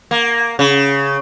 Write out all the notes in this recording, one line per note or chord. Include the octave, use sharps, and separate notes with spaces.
A#3
C#3